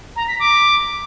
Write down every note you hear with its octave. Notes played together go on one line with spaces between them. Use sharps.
A#5
B6
D6